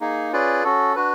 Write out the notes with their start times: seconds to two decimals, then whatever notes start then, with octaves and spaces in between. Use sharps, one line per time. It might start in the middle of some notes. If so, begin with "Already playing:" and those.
0.01 A#3 D#4 G#4
0.32 C#4 F4 G#4 B4 D5
0.64 C#4 F#4 A4
0.96 D4 F#4 B4